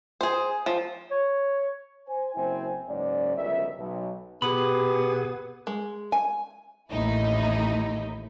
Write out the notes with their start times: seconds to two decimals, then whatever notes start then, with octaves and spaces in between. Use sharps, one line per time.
0.21 G#4 C5
0.66 F3
1.11 C#5
2.07 C5 G#5
2.35 F#1 C4 E4 C5 G5 G#5
2.88 F#1 G#2 C#4 D5
3.36 G1 C#2 F#2 B4 E5
3.78 B1
4.42 B2 B3 G4 G#4 B5
5.67 G#3
6.12 G#5
6.90 A1 D#2 A2 D#4 E4